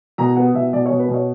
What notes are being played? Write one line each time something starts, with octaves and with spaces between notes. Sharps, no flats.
B2 A#5
B3 F#5
B2 E5
B2 D5
C#5
B2
B4
B2
C#5